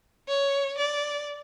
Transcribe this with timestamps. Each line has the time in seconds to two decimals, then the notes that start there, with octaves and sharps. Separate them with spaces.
0.28 C#5
0.78 D5